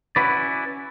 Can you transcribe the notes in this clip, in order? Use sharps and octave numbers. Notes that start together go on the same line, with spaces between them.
C#4 E4 F#4 B4 D5